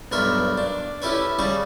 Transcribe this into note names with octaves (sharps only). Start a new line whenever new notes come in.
B1 G2 A#4 E5 C#6
D4
C#4 E4 G4 A4 B4 C#5
C#3 G3 G#4 A5 C#6